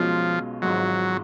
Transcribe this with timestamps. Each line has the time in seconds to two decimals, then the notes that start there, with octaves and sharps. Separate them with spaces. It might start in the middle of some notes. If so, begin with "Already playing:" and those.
Already playing: B1 B2 F3 G#3 C#4 F4
0.62 G#1 G#2 F3 F#3 G#3